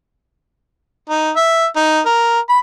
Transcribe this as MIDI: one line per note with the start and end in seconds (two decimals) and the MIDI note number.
1.10 1.31 63
1.36 1.65 76
1.76 2.00 63
2.06 2.40 70
2.49 2.58 83